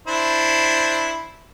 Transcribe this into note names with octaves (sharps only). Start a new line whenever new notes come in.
D4 E4 C5